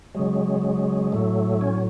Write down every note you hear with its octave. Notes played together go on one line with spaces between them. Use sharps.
C#3 F#3 G#3
A2 F#3 A3
C#4